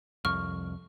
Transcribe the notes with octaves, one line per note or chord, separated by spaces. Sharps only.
C2 F2 C#6 F6